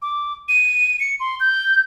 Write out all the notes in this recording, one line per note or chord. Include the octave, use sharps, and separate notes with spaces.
D6
D#7
C#7
C6
G6